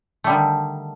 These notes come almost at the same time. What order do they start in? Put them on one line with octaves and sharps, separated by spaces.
A3 G3 D3 D#3